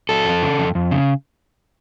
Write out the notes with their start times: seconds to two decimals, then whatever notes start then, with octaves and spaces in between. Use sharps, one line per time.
0.09 F#3 A4
0.25 F2
0.42 C#3
0.58 F2
0.75 F2
0.91 C#3